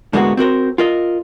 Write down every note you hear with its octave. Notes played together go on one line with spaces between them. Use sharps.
A2 D3 G#3 A#3 B3 F#4
C4 F#4 A#4 C5
F4 A#4 D#5